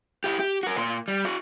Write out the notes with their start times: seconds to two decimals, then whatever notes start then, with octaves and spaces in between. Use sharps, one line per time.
0.24 E4 G4
0.39 G4
0.63 F#4 A#4
0.77 A#2 C6
1.08 G3
1.25 E4 F#4